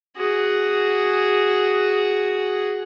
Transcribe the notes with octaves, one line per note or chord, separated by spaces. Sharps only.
F#4 G#4